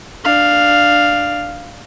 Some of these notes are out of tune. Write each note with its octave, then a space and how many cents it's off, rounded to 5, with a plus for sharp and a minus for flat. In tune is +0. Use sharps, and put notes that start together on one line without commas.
D4 +10 F5 +0